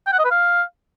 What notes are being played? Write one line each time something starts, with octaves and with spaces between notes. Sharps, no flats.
G5
F#5
D#5
B4
F5